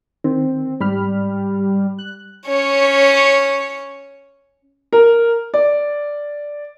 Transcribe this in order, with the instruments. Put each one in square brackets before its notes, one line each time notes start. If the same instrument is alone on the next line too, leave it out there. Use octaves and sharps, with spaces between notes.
[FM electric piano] D#3 [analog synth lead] C4
[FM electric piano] G#2 B5 F6 [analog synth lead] G3
[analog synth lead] F#6
[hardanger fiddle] C#4 C#5
[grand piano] A#4
D5